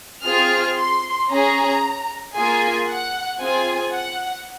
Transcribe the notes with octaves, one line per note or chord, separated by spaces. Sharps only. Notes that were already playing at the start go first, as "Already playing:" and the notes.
C4 F4 G#4 F6
C6
C#4 G#4 A#5
A#3 F4 G#4 G#5
F#5
C4 F4 G#4 G#5
F#5